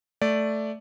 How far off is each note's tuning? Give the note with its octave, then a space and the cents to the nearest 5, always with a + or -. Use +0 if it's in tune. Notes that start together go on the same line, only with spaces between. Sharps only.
A3 +0 D5 -5